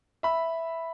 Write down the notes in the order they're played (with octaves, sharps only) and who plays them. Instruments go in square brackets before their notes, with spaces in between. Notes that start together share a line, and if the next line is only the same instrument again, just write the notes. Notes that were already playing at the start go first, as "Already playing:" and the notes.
[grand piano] E5 B5